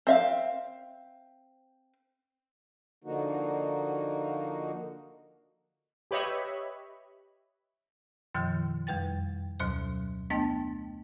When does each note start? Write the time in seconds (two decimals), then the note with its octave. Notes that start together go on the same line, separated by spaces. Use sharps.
0.07 C4 E5 F5
3.04 D3 F3 A#3 D#4 F#4
6.11 G4 B4 C#5 D#5 E5 B5
8.34 F#2 B2 D#3 F3 F6 G6
8.87 F2 G3 B4 G5 A6
9.60 D2 B2 F#3 C5
10.30 A3 B3 D4 D#5 G5 A5